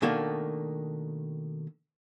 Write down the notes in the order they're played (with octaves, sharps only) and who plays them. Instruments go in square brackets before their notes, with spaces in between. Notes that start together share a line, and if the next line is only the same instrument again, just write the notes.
[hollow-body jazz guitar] B2 D#3 A3 A#3 D4